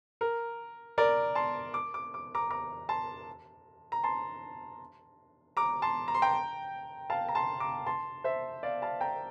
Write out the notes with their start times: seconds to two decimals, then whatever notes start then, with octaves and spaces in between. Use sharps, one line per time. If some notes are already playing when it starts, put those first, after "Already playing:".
0.21 A#4
0.98 A#4 D5
1.35 A5 C6
1.74 D6
1.94 D6
2.14 D6
2.35 A#5 D6
2.50 A#5 D6
2.89 A5 C6
3.92 A#5
4.04 A5 C6
5.57 A#5 D6
5.82 A5 C6
6.08 A#5
6.15 C6
6.22 G5 A#5
7.10 F5 A5
7.29 A#5
7.35 A5 C6
7.60 A#5 D6
7.86 A5 C6
8.24 C5 E5
8.63 D5 F5
8.82 F5 A5
9.01 G5 A#5